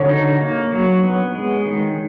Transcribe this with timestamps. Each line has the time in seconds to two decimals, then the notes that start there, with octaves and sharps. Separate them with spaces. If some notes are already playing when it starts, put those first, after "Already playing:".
Already playing: D3 C#5
0.09 D#4
0.41 A#3
0.72 F#3
1.03 B3
1.35 G#3
1.66 D#3